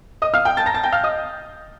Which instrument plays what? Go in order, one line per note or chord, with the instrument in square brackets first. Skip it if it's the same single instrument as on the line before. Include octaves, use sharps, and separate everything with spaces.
[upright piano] D#5 D#6
F5 F6
G5 G6
A5 A6
A#5 A#6
A5 A6
G5 G6
F5 F6
D#5 D#6